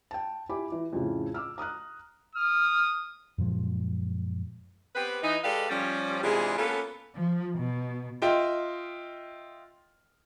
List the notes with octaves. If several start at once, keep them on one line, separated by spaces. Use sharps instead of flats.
G5 A5
E4 G4 G#5 B5 D6
E3
F2 A2 C#3
D6 E6 F6
A#5 D#6 F6 F#6
D#6 F6
F#2 A#2 F3 G#3
B3 C4 G4 B4
E3 D#4
G#3 G4 A4 B4 D5 F5
F3 G3 C#4
C3 E3 G#3 D4 F4 G#4
A#3 B3 C#4 F4 A4
F3
B2
F4 D#5 E5 G5